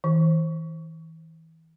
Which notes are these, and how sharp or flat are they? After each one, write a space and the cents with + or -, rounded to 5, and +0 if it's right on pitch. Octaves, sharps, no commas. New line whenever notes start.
E3 -35